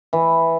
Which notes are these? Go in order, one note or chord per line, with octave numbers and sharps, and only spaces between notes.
E3